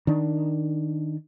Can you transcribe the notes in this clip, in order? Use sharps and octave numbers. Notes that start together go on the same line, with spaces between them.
D#3 D4